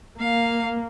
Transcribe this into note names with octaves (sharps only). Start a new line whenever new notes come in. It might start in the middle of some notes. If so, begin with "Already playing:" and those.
A#3 F5